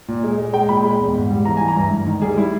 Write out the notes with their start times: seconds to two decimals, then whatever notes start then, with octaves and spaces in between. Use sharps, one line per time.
0.08 A#2
0.24 G#3
0.38 G#3
0.53 G#3 G5
0.69 A#2 B5
0.84 G#3
1.00 E2
1.15 G#2
1.30 G3
1.45 E3 A#5
1.57 E3 G#5
1.68 A#5
1.76 G2
1.91 G2
2.07 D#3
2.22 G3 G#4
2.37 G3 E4